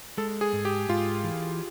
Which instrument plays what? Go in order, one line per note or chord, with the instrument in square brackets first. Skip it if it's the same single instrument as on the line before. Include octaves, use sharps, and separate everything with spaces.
[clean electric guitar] G#3 [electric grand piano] A4
[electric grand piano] G#4
[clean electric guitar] G#2
[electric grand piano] G4
[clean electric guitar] G#2 [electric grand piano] F4
[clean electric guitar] E3